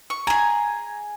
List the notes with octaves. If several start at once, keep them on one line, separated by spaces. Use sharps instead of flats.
C#6
G#4 G#5 A#5